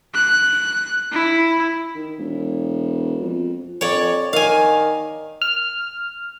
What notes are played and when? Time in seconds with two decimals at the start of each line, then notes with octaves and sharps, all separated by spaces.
0.14 F#6
1.12 E4
1.95 D#3
2.18 E1
3.21 F2
3.81 F2 C#5 D5
4.33 D#3 F5 G#5
5.42 F6